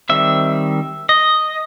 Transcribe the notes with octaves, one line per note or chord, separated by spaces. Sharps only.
D#3 G3 C4 E5
D#5